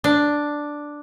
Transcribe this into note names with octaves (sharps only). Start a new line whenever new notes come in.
D4